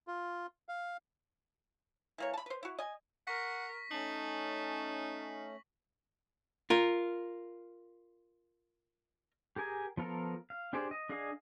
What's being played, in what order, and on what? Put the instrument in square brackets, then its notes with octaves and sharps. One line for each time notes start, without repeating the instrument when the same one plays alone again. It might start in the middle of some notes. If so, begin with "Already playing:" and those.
[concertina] F4
F5
[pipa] E3 A#3 C#5
A5 B5
B4 C5
E4 F#4
D#5 G#5
[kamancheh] A#4 [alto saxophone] F#5 [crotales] C#6 A#6 B6
[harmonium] A3 C#4 [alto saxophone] D#4 [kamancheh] A5 [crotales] F#7
[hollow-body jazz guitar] F4 A#4
[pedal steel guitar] G4 G#4 A#4 G#5
F3 B3 F4 A4 A#4
F5
D4 G4 G#4 C5 D5
D#5
D4 G#4 D#5 F5 G#5